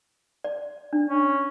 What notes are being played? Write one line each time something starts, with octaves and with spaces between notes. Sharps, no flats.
D5
D4
C#4